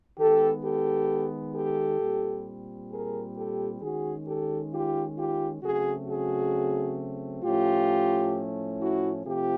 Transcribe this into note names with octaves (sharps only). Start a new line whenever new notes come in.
D#3 G#3 B3 G4 A4
G4 A4
G4 A4
A#2 G3 C4
G#4 A#4
G4 A4
D#3 G#3 C#4 F#4 G#4
G4 A4
F4 G4
F4 G4
C#3 F#3 A3 C4 F#4 G#4
F#4 G#4
A2 F3 A3 C#4 F4 G4
E4 F#4
C3 F3 A3 C4 F4 G4